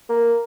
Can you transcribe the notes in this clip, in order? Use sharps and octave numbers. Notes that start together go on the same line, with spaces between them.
A#3